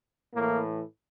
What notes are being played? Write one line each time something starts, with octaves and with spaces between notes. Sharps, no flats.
A2 E3 A#3